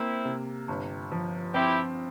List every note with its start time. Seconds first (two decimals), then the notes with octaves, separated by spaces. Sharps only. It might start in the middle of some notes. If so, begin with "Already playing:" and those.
Already playing: A#3 C4 E4
0.25 C3
0.68 G1
1.12 F3
1.54 C4 E4 G4